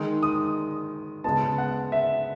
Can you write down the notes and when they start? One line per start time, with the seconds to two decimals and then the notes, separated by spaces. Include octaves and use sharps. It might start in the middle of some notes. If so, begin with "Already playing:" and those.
Already playing: D#3 G#3 D#4
0.23 D#6
1.24 C#3 G#3 B3 A5
1.58 F#5
1.92 E5